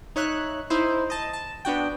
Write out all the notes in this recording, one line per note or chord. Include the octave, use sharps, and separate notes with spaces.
D#4 C#5 E5 F#6
D#4 E4 C5
D#5 A5
A5
B3 D4 F#4 G5